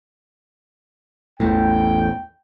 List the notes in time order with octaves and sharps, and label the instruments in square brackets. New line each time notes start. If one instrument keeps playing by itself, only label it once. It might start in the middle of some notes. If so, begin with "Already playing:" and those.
[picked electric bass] A1 E2 A2 [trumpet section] G5